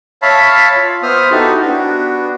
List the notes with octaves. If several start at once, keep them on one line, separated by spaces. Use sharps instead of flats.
C#5 E5 F5 A5 B5
F4
B3 C5 E5 D#6 F6
D#4 E4 F#4 G4 A4
B3 D4 F#4